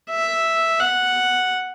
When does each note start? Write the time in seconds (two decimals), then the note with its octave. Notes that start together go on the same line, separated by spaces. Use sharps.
0.10 E5
0.80 F#5